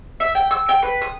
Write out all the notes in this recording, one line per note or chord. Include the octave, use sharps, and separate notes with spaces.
E5
G5
E6
G5
B4
D#6